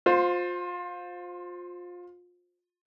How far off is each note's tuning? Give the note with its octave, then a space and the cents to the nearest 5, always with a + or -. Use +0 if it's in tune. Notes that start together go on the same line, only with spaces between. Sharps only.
F4 +25 C5 +0